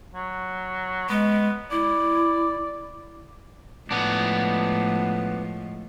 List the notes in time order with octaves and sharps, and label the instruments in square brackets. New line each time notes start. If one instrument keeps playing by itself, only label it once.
[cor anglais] F#3
[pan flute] G#3 [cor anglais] B3
[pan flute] E4 [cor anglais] D5
[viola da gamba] A2 F3 G#3 [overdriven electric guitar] B3 D4